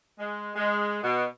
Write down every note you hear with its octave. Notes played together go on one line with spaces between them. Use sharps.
G#3
G#3
B2